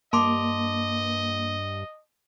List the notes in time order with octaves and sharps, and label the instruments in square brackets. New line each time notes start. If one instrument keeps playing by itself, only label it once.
[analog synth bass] G2 [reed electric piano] A#3 [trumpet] D#5 [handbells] A5 C6 D6